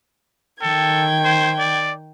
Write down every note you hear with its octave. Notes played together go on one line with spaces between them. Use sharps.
D#3 A4 G5 G#6
C5
D5